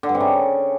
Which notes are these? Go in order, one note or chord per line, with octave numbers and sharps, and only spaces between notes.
D3
G2
C3
C#3